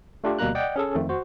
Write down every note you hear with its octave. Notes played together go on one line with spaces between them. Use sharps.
A3 D4 F4 G4
D2 B2 G3 A#3 A#5 F#6
D5 D#5 F#5 G5
C#4 G#4 A4
F2 D#3 A3 C4
F#4 C5